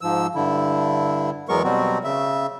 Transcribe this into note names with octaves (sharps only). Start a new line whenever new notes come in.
G#2 F3 E6
G2 D3 E4
E2 F#3 G#3 B3 A#4 C#6
B2 F#3 G3 C4 F#4
C#3 E5